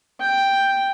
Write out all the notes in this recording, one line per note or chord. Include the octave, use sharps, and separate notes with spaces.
G5